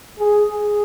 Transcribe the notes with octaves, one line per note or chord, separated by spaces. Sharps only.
G#4
G#4